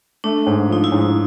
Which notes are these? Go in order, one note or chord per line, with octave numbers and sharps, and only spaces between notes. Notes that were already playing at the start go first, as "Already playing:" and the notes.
A3 D4
G#2
F3 D#4
E4
G#2